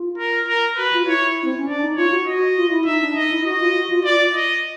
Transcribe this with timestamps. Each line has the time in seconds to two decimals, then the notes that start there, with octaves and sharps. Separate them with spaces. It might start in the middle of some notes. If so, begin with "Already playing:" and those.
Already playing: F4
0.18 A#4
0.47 A#4
0.77 F#4 B4
0.93 F4
1.07 E4 C#5
1.44 C4
1.57 C#4
1.66 D4 D5
1.82 D#4
1.96 F4 C#5
2.12 F#4
2.27 D#5
2.57 F4
2.70 E4
2.85 D#4 E5
3.01 D4
3.16 D#4 D#5
3.31 E4
3.45 F#4 D#5
3.60 F4
3.74 F#4
3.90 F4
4.05 F4 D5
4.19 F4
4.35 D#5